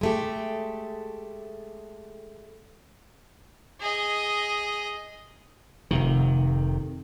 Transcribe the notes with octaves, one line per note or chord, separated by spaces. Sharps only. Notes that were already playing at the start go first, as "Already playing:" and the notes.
G#3 A3 G4
G#4 D#5
F1 C3 D#3